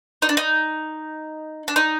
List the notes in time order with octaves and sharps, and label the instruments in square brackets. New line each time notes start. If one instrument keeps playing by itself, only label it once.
[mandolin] D#4
D4
D#4
D4
D#4